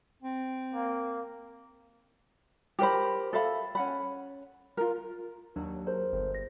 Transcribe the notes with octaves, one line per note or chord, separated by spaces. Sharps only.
C4
A#3
G4 A#4 C5 B5
A4 E5 F5 B5
C#4 F#5 B5
F4 A#4
D#2 F#3 D4
G#4 A#4 C5
G1
A#6